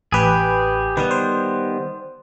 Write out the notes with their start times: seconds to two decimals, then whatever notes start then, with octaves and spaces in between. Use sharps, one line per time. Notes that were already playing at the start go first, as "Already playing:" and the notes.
0.12 A1 G4 G#4 B4
0.97 D#3 G3 B3 B4
1.11 C5